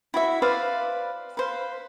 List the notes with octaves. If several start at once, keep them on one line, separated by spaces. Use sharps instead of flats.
E4 F#4 E5
B4 C5 D5 F5
B4 C5 F5